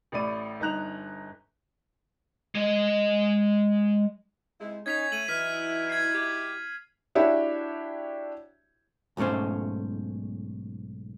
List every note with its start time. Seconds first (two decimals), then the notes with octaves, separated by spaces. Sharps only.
0.12 A1 A2 D5 D#7
0.60 G1 D#4 A#5 F#6 F7
2.55 G#3 D#5
4.60 C3 G#3 D#4 E4
4.86 C#4 D#4 G#6 B6 F7
5.12 A3 D#7 F#7
5.28 E3 F#3 D#4 E4 F6 B6
5.90 G#6 C7
6.14 G4
7.15 D4 E4 F#4 G4 C#5 E5
9.17 B1 G#2 A3 C#4 C5